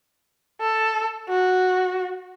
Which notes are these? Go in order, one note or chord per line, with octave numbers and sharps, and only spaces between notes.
A4
F#4